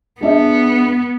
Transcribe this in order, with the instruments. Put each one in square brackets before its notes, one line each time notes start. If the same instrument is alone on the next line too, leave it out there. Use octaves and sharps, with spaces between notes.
[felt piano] G#3 D4 E5 [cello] B3